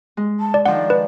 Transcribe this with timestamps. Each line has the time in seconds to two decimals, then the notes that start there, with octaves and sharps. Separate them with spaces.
0.17 G#3
0.40 A5
0.54 D5
0.66 D#3 F3 D4 D5 F#5
0.90 B4